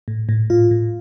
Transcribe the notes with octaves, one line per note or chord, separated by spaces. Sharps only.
A2
A2
A2 F4
A2